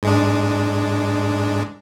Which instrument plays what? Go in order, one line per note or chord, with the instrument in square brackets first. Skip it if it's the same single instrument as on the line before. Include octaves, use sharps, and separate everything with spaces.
[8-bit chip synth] G#2 G#3 D4